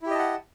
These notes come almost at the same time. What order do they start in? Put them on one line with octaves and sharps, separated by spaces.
E4 G4 D#5 A5 F#5